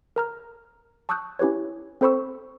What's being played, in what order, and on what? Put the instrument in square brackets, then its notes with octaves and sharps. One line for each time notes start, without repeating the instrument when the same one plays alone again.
[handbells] A#4 A#5 F6
A5 C#6 D#6 E6 F#6 G6
C#4 E4 G4 B4 C#5
C4 A4 C5 B5 C#6 E6